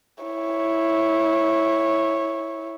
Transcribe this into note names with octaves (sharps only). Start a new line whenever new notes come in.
E4 C#5